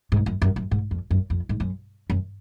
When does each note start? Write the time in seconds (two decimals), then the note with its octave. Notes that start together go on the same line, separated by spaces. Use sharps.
0.12 G#2
0.26 F#2
0.42 F#2
0.56 F#2
0.71 G#2
0.91 F2
1.11 F#2
1.30 F2
1.49 G#2
1.60 F#2
2.10 F#2